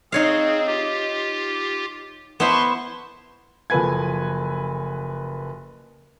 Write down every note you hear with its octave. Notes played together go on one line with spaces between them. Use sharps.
C4 D#4 G#4 C#5 F5
F4 G4
B3 E4 C5 A5 C6 C#6
F#1 F3 A4 B4 G#5 G#6